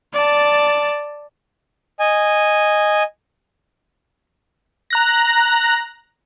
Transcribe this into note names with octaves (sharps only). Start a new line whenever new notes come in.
D5 A5
D#5 G#5
A#5 F#6 A#6